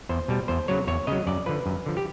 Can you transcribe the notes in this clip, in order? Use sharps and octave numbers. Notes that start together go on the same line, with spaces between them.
E2 C5
B2 G3
E2 C5
C#3 F#3 C#5
E2 C#5
C#3 F#3 D#5
F#2 D5
D3 F3 B4
F#2
D3 F3
G4